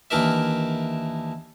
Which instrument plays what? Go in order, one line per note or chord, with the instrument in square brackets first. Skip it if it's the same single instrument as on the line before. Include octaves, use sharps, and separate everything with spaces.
[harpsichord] D#2 E3 D4 A#4 D5 E5